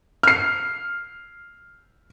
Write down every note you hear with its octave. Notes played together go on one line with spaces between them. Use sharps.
F6 C7